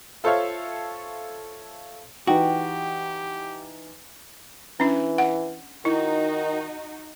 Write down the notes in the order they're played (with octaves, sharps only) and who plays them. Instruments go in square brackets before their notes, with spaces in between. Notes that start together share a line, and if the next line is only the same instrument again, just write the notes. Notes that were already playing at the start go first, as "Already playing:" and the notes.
[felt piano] F4 A4 C5 C#5 E5 F5
[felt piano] E3 D#4 [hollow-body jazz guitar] F#4 [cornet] G4 [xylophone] G5
[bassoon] E3 [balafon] C#4 D4
[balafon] F#5
[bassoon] D#3 [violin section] D#4 F#4 [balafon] E4